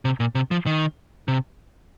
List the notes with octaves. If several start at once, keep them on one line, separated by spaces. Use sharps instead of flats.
C3
A#2
C3
F3
D#3
C3